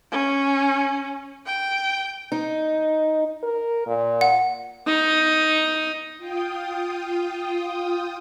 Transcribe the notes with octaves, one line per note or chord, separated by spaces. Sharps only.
C#4
G5
D#4
A#4
A#2
F#5
D#4
F4 G5 D#6